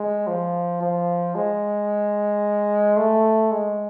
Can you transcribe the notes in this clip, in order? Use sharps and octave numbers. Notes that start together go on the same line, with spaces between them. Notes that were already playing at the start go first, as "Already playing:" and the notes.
Already playing: G#3
F3
F3
G#3
A3
G#3